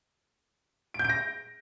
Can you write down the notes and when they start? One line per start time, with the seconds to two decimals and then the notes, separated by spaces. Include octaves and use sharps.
0.94 D7
0.99 G6
1.04 D7
1.10 A#6